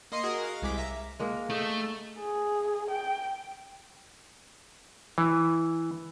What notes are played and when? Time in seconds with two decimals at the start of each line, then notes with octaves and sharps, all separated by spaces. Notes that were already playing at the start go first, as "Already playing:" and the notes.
0.12 A#3 D#5 C6 C#7 D#7
0.23 F#4 G#4 A#4 D#5
0.44 F5
0.62 C2 G#3 D6 B6
0.77 E5 A#5
1.19 G#3 A#3 A#4
1.50 A3 D#4
2.19 G#4
2.90 G5
5.18 E3